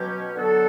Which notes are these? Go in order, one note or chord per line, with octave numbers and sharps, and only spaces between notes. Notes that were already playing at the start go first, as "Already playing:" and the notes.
Already playing: B2 F#3 C#4 G4
D3 F#3 B3 F#4 A4